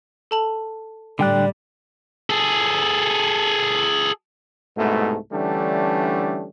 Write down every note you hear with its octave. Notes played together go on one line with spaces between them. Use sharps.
A4 A5 F#7
A2 D3 G3 D5 G5 F#6
G#4 A4
C2 G#2 B2 A3
D3 E3 G3 A3 C#4 D4